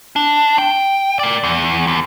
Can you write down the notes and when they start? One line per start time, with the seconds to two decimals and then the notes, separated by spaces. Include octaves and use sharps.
0.16 D4
0.58 G5
1.19 A#4 D5
1.43 E2
1.87 D#2